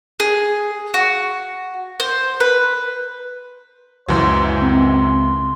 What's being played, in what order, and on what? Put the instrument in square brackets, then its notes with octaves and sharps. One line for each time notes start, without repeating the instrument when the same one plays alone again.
[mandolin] G#4
F#4
C5
B4
[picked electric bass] C#2 [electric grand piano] F#2 E3 F#3 [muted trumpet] C5
[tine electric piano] C4 [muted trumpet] C6